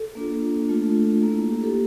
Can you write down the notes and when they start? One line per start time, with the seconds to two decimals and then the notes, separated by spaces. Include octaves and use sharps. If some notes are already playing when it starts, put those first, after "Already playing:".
Already playing: A4
0.15 A#3 D4 F4
0.69 A3 D4 F4 A4
1.23 A#3 E4
1.52 G4
1.63 A4